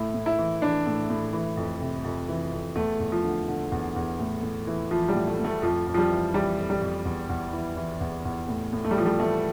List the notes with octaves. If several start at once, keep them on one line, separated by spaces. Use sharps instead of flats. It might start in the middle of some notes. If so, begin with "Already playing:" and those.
Already playing: A2 E4
A2
E4
E3
E3 D4
A2
A2
E3
F2
C3
F2
E3
F2
E2 A3
E2
F3
D3
D3
E2
E2
A2
A2
E3
E3 F3
G3
A2
A3
A2
A3
F2 F3
F2
F3
G3
E3
E3 G3
F2
G3
F2
E2
E2
E3
E3
E2
E2
A2
A2
A3
G3
E3 F3
G3
E3 A3